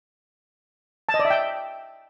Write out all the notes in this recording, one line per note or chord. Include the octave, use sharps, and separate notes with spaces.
A5
D#5
D5
E5
G5